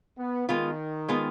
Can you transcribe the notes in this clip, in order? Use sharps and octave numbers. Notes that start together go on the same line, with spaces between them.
B3
D#3 G#3 B3 F4
G#3 B3 F4